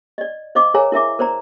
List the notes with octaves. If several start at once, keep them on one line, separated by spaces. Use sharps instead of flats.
D5 D#5
C5 D#5 F5 D6
G#4 A#4 C#5 F5 G#5 A#5
E4 A#4 E5 D6
A#4 C5 D5 A#5